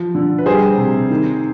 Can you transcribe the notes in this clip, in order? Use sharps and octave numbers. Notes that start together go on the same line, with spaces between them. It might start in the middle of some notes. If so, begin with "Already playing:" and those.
Already playing: F3
D3
B4
G3 G#4 C5
C3
D#3